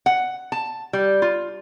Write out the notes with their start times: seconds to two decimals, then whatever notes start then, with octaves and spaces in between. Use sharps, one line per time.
0.06 F#5
0.52 A5
0.93 G3
1.22 F4